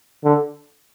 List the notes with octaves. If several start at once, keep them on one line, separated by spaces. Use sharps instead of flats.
D3